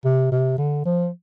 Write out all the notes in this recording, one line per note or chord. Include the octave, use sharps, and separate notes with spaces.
C3
C3
D3
F3